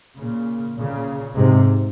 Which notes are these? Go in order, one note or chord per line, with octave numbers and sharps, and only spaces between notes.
A#2 C#3
A#2 C#3
G#2 C3